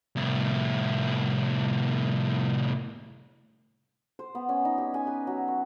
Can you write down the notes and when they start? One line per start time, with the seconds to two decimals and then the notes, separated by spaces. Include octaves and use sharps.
0.16 C2 A2
4.19 C5
4.35 B3
4.49 C#4
4.65 D#4
4.78 G4
4.94 G#5
5.07 B4
5.27 F#3
5.48 C#6